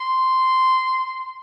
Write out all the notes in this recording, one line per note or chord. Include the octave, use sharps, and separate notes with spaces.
C6